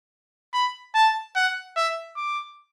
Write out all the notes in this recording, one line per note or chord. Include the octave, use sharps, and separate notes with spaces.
B5
A5
F#5
E5
D6